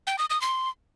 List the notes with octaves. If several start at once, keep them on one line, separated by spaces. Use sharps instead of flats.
G5
D#6
D#6
C6